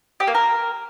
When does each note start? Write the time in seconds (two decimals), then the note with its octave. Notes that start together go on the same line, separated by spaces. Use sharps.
0.20 G4
0.27 A#3
0.35 A#4